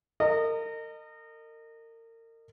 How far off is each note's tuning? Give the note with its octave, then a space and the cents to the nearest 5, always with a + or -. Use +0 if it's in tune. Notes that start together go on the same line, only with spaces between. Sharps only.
A#4 -35 D#5 -20